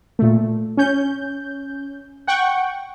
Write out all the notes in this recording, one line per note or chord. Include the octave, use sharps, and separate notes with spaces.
A#2 A3
C#4 G6
F#5 G5 C#6